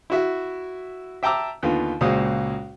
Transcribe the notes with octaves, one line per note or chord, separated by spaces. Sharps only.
E4 F#4 E5
E5 G5 A5 A#5 D6 E6
D#2 D3 B3 F4
C#2 A#2 G#3 F#4 C5 D#6